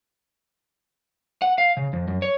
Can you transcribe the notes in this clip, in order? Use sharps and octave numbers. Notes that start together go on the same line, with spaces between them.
F#5
F5
C#3
F2
F#2
C#5